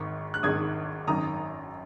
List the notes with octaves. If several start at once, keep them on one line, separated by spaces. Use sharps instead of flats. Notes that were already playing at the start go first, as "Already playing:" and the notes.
Already playing: G#1 G#2 D#3 C#6
F#6
G#1 G#2 D#3 D#6 G#6
G#1 F#2 D#3 A#5 D#6